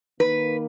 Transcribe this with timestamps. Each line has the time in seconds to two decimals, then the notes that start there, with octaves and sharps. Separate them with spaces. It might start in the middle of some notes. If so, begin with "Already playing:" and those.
0.20 D#3 A#3 D#4 B4